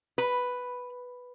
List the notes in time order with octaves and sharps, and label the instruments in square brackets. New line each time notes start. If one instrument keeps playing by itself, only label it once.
[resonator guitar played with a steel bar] B4